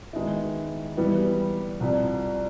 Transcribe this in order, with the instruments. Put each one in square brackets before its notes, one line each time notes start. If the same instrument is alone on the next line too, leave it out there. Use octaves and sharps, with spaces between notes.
[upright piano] D#3 G#3 B3 E4
E3 G3 B3
C2 C3 F3